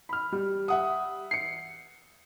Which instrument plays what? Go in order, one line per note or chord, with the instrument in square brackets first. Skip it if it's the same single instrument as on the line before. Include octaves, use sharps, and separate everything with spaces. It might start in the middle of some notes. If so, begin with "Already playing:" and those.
[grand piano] B5 F6
G3
[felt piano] E5 F#5 D#6
[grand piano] C7 C#7